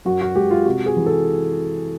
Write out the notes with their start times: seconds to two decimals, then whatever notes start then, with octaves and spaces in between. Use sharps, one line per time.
0.05 F#2 F#4
0.21 F#4
0.35 G#3 G4
0.51 F4
0.66 C3 F#4
0.86 G#4
0.97 E3
1.06 A4